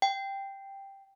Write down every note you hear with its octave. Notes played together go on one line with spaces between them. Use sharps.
G5